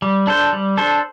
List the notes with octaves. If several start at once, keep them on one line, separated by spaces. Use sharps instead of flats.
G3
D4 A4 C5
G3
D4 A4 C5